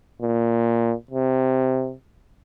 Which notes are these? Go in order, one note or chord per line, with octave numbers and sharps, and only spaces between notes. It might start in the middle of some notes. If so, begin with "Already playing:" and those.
A#2
C3